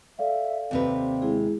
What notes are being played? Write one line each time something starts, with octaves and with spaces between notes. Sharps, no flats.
A4 D5 E5 F5
D#2 C3 C4 B4
G#3 E4 G#4